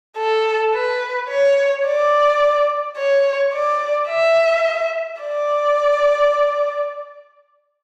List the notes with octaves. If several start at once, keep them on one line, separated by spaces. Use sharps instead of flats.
A4
B4
C#5
D5
C#5
D5
E5
D5